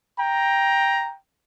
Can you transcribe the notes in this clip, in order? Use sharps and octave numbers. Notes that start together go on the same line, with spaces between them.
G5 A#5